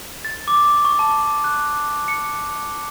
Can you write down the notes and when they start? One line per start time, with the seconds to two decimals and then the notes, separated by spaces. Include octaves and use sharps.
0.25 A6
0.48 D6
0.85 C#6
0.99 A5
1.44 F#6
2.08 C#7